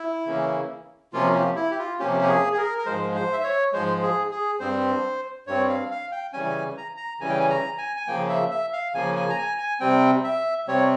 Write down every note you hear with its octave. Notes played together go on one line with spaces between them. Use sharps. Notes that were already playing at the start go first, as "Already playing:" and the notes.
Already playing: E4
C#3 E3 A#3 C#4
C3 F3 A#3 C#4 F4
F4
G4
E4
G4
F4
C3 F3 A#3 C#4 G4
G4
G#4
G#4
A#4
A#4
G#2 F3 G#3 C5
C5
E5
C#5
G#2 F3 G#3 C5
G#4
G#4
G2 G3 C4 C5
G2 G3 C4 C#5
F5
F5
G5
C#3 E3 G3 C#4 G#5
A#5
A#5
C#3 E3 G3 C#4 G#5
G5
G#5
A#5
G#5
G#5
C#3 F3 A#3 G5
E5
E5
F5
C#3 F3 A#3 G#5
G#5
A#5
G#5
G#5
C3 G3 C4 G5
E5
C3 G3 C4 C#5